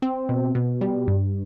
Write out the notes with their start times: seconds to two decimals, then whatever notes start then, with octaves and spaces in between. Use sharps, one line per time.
0.02 C4
0.29 B2
0.55 B2
0.81 G3
1.08 G2